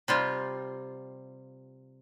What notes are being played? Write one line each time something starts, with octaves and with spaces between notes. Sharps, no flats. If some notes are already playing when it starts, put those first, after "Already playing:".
C3 G3 F4